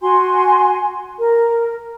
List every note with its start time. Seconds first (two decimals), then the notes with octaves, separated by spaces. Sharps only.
0.01 F#4 G#5 C6
1.18 A#4